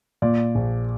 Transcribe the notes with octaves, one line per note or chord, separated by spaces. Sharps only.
A#2 D5
A#1